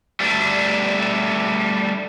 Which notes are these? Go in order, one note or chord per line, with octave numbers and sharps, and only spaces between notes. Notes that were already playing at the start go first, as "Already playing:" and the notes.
G3 A3 D4